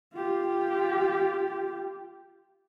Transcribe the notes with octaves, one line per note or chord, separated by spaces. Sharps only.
F4 G4